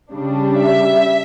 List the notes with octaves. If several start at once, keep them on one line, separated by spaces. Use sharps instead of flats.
C#3 G3 D4
E5